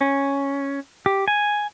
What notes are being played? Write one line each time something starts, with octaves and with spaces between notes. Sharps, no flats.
C#4
G4
G#5